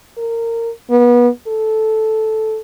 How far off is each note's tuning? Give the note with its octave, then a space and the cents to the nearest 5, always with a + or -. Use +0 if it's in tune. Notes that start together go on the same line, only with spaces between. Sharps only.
A#4 -20
B3 -30
A4 -10